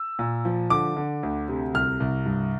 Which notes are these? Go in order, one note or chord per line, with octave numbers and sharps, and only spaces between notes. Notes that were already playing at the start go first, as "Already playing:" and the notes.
Already playing: E6
A#2
F3
D3 D6
D3
D2
C3
C2 F6
C2
G2